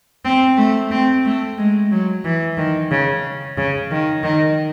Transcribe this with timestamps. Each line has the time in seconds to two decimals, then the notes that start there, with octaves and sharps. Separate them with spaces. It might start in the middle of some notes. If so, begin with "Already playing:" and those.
0.25 C4
0.58 A3
0.91 C4
1.25 A3
1.58 G#3
1.92 F#3
2.25 E3
2.58 D#3
2.91 C#3
3.58 C#3
3.91 D#3
4.23 D#3